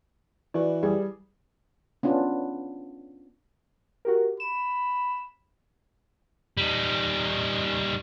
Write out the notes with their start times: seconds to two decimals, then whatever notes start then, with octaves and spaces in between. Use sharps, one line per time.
0.54 E3 F#4 B4 D5
0.83 G3 G#4
2.03 B3 C#4 D4 F4
4.05 F#4 G4 A#4
4.40 B5 E7
6.57 G3 D#4